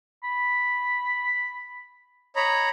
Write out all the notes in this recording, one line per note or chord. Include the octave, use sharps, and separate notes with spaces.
B5
C#5 D#5 A#5 B5